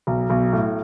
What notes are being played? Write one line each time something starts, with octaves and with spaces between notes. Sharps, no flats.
B1
B1
A2